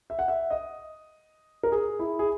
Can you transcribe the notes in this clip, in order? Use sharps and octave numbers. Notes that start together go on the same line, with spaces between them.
E5
F#5
E5
D#5
A#4
G#4
E4
G#4